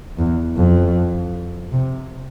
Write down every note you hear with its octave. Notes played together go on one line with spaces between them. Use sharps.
E2
F2
C3